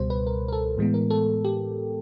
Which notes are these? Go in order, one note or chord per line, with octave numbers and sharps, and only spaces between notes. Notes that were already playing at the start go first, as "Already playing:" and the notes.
Already playing: C#2 B2 G3 C5
B4
A#4
A#4
A4
A2 E3 G#3 B3
A#4
A4
G4